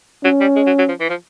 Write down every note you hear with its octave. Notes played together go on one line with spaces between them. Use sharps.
F#3 C#4
G3
G#3
F#3
F#3
F3
E3
F3